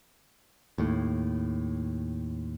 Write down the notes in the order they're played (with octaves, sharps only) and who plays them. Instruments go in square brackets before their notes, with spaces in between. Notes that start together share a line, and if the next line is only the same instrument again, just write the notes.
[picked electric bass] D#2 A2